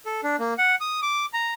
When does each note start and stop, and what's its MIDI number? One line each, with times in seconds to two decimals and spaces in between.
0.06 0.21 69
0.23 0.36 62
0.39 0.54 58
0.58 0.75 78
0.81 1.00 87
1.02 1.26 86
1.33 1.54 82